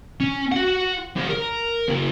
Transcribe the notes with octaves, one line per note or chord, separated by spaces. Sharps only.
C#4
F#4 F#5
C4 G#4
A#4
C#3 A#3